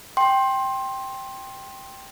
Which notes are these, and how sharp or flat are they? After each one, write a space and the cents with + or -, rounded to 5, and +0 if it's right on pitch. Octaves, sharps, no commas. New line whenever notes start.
G5 +0 C6 +20